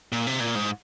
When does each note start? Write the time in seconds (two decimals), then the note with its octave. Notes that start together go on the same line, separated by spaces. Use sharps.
0.12 A#2
0.27 C3
0.40 A#2
0.55 G#2